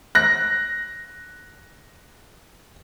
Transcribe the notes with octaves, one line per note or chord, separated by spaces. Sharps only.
F#6 A#6